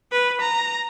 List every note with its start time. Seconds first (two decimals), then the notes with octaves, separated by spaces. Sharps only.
0.12 B4
0.41 A#5